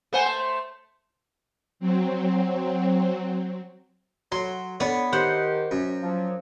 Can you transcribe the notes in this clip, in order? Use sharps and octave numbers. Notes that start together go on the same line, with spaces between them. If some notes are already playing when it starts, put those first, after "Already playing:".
A3 B4 C5 F#5 G#5
A5
F#3 C4
F#3 C6
B3 D4 C#5
D#3 G4 C5 F#5
F#2
F3 F#3